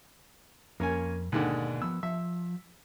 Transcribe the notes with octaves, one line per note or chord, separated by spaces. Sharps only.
F2 A#3 C#4 G#5
D#2 G#2 B2 D3 D5
F3 B3 E6
F3 E5